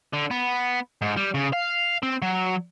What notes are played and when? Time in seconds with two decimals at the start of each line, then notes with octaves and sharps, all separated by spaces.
0.14 D3
0.31 B3
1.02 G#2
1.17 G3
1.34 C#3
1.53 F5
2.03 C4
2.22 F#3